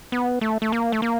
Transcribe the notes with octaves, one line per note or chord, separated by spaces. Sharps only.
B3
A3
A3
A#3
A3
A#3